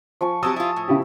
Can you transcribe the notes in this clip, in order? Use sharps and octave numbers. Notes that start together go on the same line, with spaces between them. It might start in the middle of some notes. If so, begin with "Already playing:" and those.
F3 G#5 C#6
F#3 C4 G4 A5 D#6 E6
E4 F4
A2
C#3 E4 G4